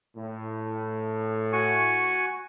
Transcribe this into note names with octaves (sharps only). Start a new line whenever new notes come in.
A2
F#4 G#5 C#6